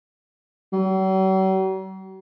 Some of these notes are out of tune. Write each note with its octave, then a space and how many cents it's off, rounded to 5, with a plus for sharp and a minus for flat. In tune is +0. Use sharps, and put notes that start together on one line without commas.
F#3 +45